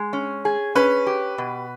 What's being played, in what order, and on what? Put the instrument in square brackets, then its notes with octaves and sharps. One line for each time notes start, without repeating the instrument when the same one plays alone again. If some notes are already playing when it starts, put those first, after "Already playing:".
Already playing: [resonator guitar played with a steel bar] G#3
C#4
G#4
[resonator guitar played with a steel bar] C#4 [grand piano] B4
[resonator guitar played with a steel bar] G4
B2